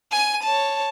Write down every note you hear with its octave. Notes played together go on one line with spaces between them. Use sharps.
G#5 D#7
C#5 A5